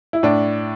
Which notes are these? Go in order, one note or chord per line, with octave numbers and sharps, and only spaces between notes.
E4
A2 D4